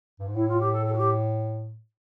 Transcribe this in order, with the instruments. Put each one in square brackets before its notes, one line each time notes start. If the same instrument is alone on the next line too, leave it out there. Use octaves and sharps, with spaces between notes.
[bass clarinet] G2
G#2
[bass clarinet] A2 [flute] E4
[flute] F4
G4
A4
A4
F#4
G4